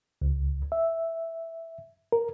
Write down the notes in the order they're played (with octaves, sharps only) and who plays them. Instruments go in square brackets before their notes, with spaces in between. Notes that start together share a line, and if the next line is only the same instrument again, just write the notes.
[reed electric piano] C#2
E5
A#4